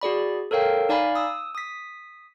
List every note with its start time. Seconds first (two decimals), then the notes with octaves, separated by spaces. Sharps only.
0.01 F#4 G#4 D5 B5
0.51 A4 A#4 C#5 F5 G5
0.89 D#4 D5 F5 G#5 B5
1.16 D#6 E6
1.55 D#6 B6